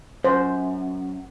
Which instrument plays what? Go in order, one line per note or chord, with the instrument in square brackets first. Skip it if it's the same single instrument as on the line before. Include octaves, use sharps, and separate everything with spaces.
[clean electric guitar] F#2 [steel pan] C5